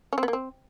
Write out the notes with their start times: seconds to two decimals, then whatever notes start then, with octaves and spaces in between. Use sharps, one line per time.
0.13 C#4
0.18 C4
0.23 B3
0.28 A#3
0.33 C4